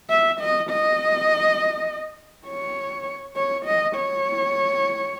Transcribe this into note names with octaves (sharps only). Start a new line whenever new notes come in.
E5
D#5
D#5
C#5
C#5
D#5
C#5